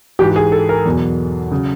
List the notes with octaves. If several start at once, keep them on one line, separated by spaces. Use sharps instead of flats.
G#2 E3 G4
G#4
A4
A#4
E2 B2 F#3
C#3 F#3